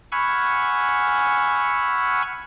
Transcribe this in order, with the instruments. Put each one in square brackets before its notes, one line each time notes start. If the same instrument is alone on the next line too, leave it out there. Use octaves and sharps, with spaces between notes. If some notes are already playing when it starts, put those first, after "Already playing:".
[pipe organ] F#5 G#5 B5 C#6 E6 F6